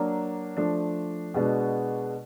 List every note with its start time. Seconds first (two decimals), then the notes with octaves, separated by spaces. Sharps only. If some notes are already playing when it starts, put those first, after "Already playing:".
Already playing: F#3 A#3 D4
0.57 F3 A3 D4
1.34 B2 G#3 B3 D4 F#4